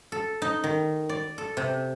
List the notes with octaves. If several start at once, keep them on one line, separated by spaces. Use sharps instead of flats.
A4
D#4
D#3
D5
A4
C3